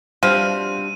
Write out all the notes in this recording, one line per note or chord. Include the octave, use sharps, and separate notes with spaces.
B2 F3 G3 C4 D4 E5 F5 D#7